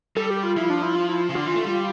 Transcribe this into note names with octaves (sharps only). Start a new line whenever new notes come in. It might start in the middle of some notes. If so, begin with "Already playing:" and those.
G3 A4
G4
F4
F3 E4
D4
E4
F4
E4
C#3
D3 F4
E3
A3
G3